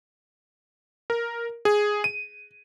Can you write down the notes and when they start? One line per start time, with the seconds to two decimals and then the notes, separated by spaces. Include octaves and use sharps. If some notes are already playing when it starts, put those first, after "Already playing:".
1.10 A#4
1.65 G#4
2.04 D#7